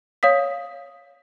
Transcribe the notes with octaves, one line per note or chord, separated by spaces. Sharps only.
C#5 F5 D#6 B6